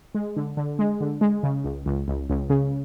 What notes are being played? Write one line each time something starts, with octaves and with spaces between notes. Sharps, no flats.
G#3
D3
D3
G#3
D3
G#3
C#3
C#2
C#2
C#2
C#2
C#3